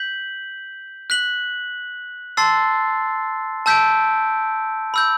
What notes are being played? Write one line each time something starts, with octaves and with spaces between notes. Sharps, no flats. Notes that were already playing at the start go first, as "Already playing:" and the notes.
Already playing: G6 B6 F#7
F#6 B6 F#7
A5 C6 E6 A6 C7
A5 E6 G6 B6 D7
B5 E6 G6